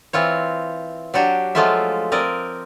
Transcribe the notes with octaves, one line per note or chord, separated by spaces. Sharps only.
E3 C4 F4 C#5
F#3 D4 F#4 G4
F3 F#3 G#3 A3 F4 E5
C4 A#4 D5 D#5